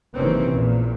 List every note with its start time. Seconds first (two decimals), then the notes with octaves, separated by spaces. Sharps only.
0.16 F#1 C3 D#3 E3 C4 C#4
0.52 A#1 E2 A#2